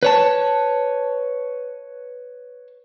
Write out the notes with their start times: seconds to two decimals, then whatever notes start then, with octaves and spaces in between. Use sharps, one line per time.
0.03 B4 C#5 A5